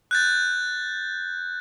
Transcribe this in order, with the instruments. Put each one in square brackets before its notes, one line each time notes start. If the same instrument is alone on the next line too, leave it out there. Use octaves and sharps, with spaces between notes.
[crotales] F#6 G6 A6